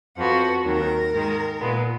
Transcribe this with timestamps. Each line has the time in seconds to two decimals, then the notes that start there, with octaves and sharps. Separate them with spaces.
0.16 F2 F3 B3 F#4
0.64 D#2 D#3 F#3 A#4
1.12 G#2 D#3 G#3
1.60 A#2 G#3 B3